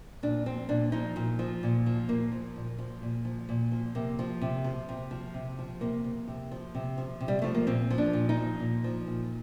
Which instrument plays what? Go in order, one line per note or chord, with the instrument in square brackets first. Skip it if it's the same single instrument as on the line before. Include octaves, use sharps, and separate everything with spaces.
[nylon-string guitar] A#2 D4
F3 C4
A#2 D4
F3 D#4
A#2
F3
A#2
F3
A#2 A#3
F3
A#2
F3
A#2
F3
A#2
F3
C3 A#3
F3
C3
F3
C3
F3
C3
F3
C3 A#3
F3
C3
F3
C3
F3
C3
G3
F3 A3
A#3
A#2 C4
F3
D4
A#2
D#4
F3
A#2
F3
A#2